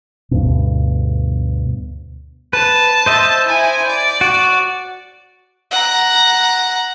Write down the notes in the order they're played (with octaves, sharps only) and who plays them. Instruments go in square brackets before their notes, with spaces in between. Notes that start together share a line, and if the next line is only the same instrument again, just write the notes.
[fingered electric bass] D2 G2 B2
[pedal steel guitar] B4 [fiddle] A5
[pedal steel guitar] C5 D#5 E5
[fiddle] E4 G#5
D5
[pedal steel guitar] F#4
[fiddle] F#5 A#5